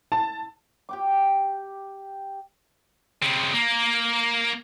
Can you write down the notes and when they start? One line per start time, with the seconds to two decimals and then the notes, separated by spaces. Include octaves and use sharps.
0.12 A5
0.89 G4 G5 D6
3.22 C#3 C4
3.53 A#3